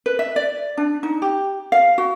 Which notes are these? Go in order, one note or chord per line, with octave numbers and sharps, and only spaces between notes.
B4
E5
D5
D4
D#4
G4
F5
F#4